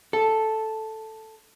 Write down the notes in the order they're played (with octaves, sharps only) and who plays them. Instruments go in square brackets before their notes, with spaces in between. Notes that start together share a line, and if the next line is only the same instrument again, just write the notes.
[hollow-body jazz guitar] A4